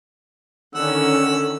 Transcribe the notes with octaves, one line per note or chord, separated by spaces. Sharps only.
D3 D#3 C#4 F#5 E6